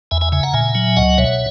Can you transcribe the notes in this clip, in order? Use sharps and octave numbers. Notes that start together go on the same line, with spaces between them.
E2 E5 G#5
E5 G#5
C#3 E5 G#5
F#5 A#5
A#2 E5 G#5
F#3
C#2 D#5 F#5
B2 C#5 E5